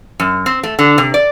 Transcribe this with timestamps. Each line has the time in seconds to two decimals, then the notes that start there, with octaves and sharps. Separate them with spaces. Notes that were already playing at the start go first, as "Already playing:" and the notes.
0.20 F#2
0.46 C4
0.63 A3
0.79 D3
0.98 C3
1.14 D5